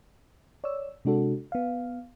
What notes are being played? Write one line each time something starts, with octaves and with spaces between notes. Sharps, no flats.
C#5 D5 E6
C3 G#3 D4 F#4 A4
B3 F5